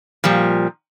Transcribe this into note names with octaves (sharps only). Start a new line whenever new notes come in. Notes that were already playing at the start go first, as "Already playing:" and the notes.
A#2 F3 G3